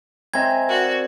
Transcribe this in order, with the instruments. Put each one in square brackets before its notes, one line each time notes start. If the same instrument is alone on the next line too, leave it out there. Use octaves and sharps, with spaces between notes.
[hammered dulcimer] C4 G#5 [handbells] D#5 E5 A#5 [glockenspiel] G#6
[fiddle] F#4 [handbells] A#4 D5